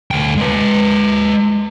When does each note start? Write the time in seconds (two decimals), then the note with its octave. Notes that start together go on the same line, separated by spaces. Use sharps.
0.11 D2 G5
0.37 G#3 B4